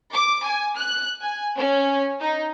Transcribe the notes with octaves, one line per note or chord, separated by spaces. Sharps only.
D6
G#5
F#6
G#5
C#4
D#4